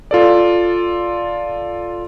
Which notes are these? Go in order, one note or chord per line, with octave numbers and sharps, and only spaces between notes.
F4 A4 D5